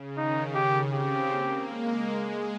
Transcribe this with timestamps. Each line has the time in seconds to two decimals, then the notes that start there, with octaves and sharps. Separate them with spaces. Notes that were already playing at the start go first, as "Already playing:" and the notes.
Already playing: C#3
0.17 D#3 D#4
0.55 C#3 G4
0.92 C4 G4
1.30 A#3
1.68 G#3
2.05 G#3